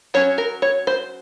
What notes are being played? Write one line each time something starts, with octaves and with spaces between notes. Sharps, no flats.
F#3 C#4 C#5
A#4
C#5
C5